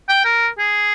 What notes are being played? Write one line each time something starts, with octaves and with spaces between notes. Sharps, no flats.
G5
A#4
G#4